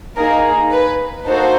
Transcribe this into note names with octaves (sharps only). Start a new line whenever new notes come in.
A#3 D#4 G#4 A#4
B4
A#3 D#4 F#4 A4 C5